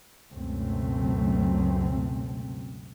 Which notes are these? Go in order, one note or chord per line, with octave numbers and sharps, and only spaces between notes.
C#2 F#2 B2 A3 C4